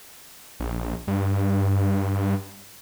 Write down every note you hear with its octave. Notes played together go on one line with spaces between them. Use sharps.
A#1
G2